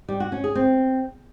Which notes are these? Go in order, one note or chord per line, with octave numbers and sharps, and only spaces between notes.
G3
F#4
C#4
G#4
C4